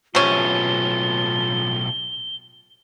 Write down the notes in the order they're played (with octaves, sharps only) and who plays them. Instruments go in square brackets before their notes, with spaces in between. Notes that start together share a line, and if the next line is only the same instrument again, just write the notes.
[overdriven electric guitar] B1 A2 [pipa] C3 C#4 [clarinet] F4 [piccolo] G7